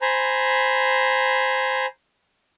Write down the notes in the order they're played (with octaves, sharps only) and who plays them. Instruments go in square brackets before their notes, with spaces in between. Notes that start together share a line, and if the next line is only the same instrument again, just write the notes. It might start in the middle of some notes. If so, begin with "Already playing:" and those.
[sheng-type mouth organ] C5 G#5 A#5 B5